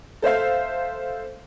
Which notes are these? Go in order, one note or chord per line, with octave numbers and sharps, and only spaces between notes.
A4 C5 E5 F5